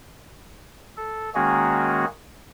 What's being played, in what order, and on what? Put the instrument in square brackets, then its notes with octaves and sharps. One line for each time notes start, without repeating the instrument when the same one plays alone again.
[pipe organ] A4
D#3 G#3 A#3 C#4 F#4 G#4